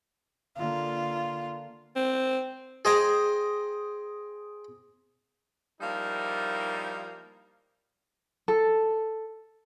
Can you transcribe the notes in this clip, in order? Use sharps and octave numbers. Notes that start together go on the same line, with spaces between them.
D3 A#3 F4
C4
G#4 C5 D#5 G5 G#5 A#5
F3 G3 A#3 D#4 E4
A4